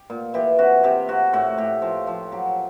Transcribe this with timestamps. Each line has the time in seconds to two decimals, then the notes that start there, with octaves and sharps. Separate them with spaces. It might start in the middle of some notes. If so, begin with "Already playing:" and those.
Already playing: G4
0.10 A#2
0.34 E3 G4
0.59 C3 F#4
0.84 C3 G4
1.09 C3 F#4
1.33 A2 F#4
1.57 A2 G4
1.82 F3
2.07 F3
2.32 F#3 G4